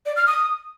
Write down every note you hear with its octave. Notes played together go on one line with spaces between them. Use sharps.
D5
F6
D#6